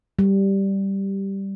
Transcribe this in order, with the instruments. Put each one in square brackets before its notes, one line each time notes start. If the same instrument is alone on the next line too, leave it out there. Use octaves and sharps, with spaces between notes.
[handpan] G3